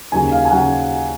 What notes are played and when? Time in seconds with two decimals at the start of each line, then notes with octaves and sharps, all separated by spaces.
0.12 D#2 C#3 F#3 G#5
0.31 F5
0.45 G#5
0.51 C#3 F#3 F#5